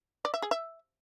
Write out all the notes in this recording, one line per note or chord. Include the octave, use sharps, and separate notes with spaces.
D5
E5
G#4
E5